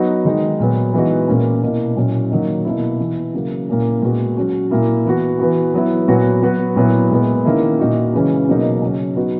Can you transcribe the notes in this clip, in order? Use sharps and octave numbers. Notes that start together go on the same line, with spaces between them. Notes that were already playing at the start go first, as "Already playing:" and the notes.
Already playing: F#3 B3 D#4 F#4
D#3 G#3 D#4
A#2 F#3 B3
E3 G#3 B3 D#4 F#4
A#2 A#3 C#4
B2 A#3 E4
A#2 F#3 C#4 E4
D#3 F#3 A#3 D#4
B2 A#3 E4
E3 B3 E4
C#3 F#3 A#3
A#2 A#3 C#4 E4
A#2 G#3 B3 F#4
F#3 C#4 F#4
A#2 A#3 E4
E3 B3 F#4
E3 B3 F#4
F#3 B3 E4
A#2 F#3 B3 F#4
F#3 B3 F#4
A#2 F#3 B3 E4
A#2 G#3 B3
D#3 A#3 C#4 E4
A#2 A#3 D#4 F#4
C#3 E3 G#3 C#4
B2 F#3 A#3 D#4
C#3 F#3 C#4
F#3 B3 D#4 F#4